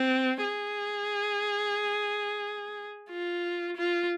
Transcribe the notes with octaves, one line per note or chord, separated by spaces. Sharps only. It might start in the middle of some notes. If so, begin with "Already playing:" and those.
Already playing: C4
G#4
F4
F4